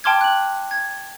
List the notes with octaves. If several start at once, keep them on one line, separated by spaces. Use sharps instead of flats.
G5 A5 C6 D6 F6 G#6
F#6 F#7
G#6